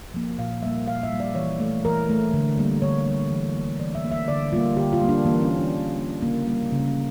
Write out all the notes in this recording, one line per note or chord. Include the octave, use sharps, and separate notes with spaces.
F3 A#3
A#2 F5
G3 A#3 E5
A#2 F5
E5
G3 A#3
D5
E3 C#5
A3
E3 A#4
A3
D3
G3 A#3
D3 C#5
G3 A#3
E3
A#3
E3 D5
E5
A#3
E5
D3 D5
G3 A#3 F4
D3 G4
F4
G3 A#3
D4
E3 A#3
C#4
A#3
D4
E3
A#3
C#3 A#3
G3 A#3
C#3